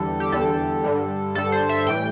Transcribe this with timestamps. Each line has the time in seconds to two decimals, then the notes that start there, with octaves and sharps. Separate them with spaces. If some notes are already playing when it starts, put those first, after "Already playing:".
Already playing: E2 D3 G3 A4
0.20 G4
0.32 E2 D3 G3 A4
0.84 G2 D3 G3
1.35 G2 D3 G3 A4
1.52 C5
1.69 E5
1.86 A2 E3 G3 G5